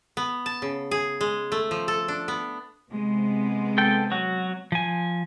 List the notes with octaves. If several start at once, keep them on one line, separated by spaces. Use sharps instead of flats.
B3
A5
C#3
G#4
G#3
A3
F3
A4
D4
B3
C3 G#3 B3
A4 G5
F#3 F#4
F3 G#5